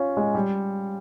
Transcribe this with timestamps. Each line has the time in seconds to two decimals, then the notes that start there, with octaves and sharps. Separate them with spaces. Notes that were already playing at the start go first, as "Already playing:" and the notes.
Already playing: C#4 F4
0.17 G#3
0.35 G3